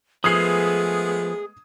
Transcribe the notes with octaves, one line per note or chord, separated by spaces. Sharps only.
F3 G#3 A3 B3 G#4 D#6 G#6 C7